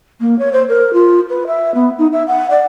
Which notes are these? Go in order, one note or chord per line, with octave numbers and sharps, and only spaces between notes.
A#3
C#5
C5
A#4
F4
B4
E5
B3
D#4
E5
F#5
D5